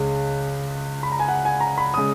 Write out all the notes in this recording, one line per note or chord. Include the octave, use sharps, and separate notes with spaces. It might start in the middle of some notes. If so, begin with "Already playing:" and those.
Already playing: C#2 C#3 G#3
B5
A#5
G#5
F#5
G#5
A#5
B5
C#3 G#3 D#6